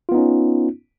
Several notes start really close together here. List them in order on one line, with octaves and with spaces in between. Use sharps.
F4 B3 D#4 C#4